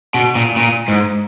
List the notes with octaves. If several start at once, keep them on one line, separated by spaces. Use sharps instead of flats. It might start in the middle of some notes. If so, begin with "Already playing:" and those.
B2
A#2
A#2
G#2